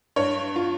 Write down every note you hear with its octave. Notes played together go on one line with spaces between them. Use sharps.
G2 C#5
F4